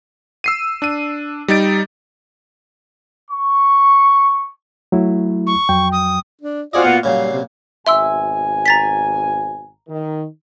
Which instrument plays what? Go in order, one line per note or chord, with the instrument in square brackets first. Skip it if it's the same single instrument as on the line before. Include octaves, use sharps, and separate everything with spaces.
[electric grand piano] E6 C7 D#7
D4 D#7
G3 D#4 A6 D7
[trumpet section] C#6
[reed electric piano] F#3 A3 E4
[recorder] C#6
[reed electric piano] F2 F#3 G5
[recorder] D#6
[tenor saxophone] D4
[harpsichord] C4 G#4 D#5 [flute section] F4 F#4 F#5 [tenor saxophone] D5
[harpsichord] A#2 [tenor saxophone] B3
[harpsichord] A#2 C#3 F#3 [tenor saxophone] G3 [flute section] F5
[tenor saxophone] C3
[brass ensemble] G#1 B2 G#5 [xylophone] E5 C6 E6
[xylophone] A#5 A6 B6
[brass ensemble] D#3